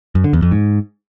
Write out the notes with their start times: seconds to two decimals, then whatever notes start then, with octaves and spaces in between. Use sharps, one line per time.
0.15 F#2
0.24 D3
0.33 E2
0.42 F2
0.51 G#2